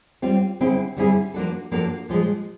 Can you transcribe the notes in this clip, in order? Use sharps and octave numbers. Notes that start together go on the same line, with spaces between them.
G3 C4 F4
D3 G3 C4 E4 G#4
D3 G3 C4 E4 G#4
F3 A#3 D4 F#4 A4
F3 A#3 D4 F#4 A4
A#2 F3 G#3